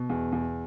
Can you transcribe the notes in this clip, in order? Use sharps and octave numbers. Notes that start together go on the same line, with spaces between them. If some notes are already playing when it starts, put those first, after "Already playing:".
Already playing: B2
E2
E2